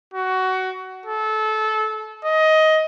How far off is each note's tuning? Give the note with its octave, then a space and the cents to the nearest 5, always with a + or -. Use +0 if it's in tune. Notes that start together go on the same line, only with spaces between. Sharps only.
F#4 +20
A4 -25
D#5 +15